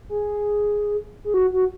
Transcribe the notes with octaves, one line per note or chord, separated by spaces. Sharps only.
G#4
G#4
F#4
F#4